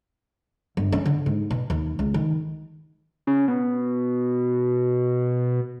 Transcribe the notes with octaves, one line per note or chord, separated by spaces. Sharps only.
G1
C#4
D3
G#2
B2
D#2
C#2
D#3
C#3
B2